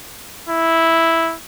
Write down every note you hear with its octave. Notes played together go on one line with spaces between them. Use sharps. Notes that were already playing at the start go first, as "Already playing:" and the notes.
E4